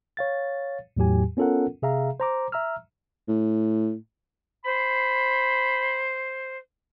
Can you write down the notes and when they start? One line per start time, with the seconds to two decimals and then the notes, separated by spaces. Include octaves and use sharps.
0.17 C#5 F5 A6
0.97 E2 A2 F#3 G4 G#5
1.37 B3 C#4 F4 A4 A#4 F#5
1.82 C3 G#4 E5 F5 A#5
2.20 C5 A#5 D6
2.52 E5 A#5 E6 F6
3.28 A2
4.64 C5 B5